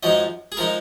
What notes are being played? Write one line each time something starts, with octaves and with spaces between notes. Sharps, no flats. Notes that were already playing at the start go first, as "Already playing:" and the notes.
F#2 F3 G#3 D#4 D#5
G#4
F3 G#3 D#4 A#4